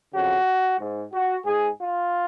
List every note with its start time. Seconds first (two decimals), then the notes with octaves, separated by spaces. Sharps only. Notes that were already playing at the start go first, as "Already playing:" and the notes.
0.13 F2 C#3 F#4
0.79 G#2
1.13 F#4
1.45 G#2 G#4
1.79 F4